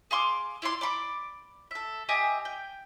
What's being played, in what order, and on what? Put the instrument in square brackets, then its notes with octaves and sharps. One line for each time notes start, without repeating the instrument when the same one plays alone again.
[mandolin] G#4 F5 C6 D6
E4 F4 D5 C6
D5 B5 C6 D6
A4 E5
G4 D#5 E5 G#5
G5